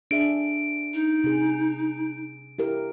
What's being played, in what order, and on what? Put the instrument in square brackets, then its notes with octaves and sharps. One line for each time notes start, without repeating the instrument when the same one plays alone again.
[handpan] D4 G#4 E5 [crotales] D7
[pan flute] D#4
[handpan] C3 G#4
E4 G4 A#4